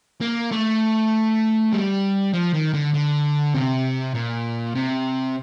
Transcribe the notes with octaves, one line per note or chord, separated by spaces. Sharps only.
A#3
A3
G3
F3
D#3
D3
D3
C3
A#2
C3